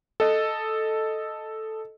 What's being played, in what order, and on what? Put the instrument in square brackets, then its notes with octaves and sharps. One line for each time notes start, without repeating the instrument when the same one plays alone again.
[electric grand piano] A4 D#5